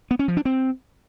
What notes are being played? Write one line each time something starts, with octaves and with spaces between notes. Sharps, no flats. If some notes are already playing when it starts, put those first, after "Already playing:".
B3
C#4
F3
D4
C4